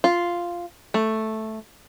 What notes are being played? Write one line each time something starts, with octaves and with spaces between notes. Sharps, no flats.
F4
A3